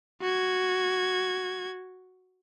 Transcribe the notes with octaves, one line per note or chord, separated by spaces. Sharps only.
F#4 G#6